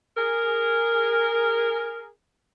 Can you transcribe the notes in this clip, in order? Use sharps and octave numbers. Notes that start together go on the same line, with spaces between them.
G#4 A#4